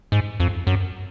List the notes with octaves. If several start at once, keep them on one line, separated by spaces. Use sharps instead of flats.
G#2
F2
F#2